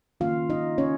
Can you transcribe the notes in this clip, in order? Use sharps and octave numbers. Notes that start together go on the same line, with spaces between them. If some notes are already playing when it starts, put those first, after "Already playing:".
D#3 A#3 C#4 F4 F5
D#4 D#5
C#4 C#5